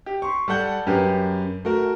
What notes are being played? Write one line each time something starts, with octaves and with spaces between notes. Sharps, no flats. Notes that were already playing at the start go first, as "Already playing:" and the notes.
G4
C6 C#6
G3 A4 F#5 G6
F#2 G4 A#4 B4
A3 F#4 A#4